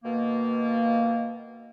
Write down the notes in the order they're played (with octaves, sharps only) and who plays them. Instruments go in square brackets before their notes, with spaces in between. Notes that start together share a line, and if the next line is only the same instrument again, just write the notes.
[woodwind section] B2 D#3 A#3